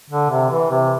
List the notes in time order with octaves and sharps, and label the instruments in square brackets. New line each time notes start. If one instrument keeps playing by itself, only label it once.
[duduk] D3
C3
E3
C3